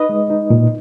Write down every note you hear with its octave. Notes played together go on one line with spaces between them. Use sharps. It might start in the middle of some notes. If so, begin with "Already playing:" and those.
Already playing: D#4 B4 D#5
G#3
D#4
A#2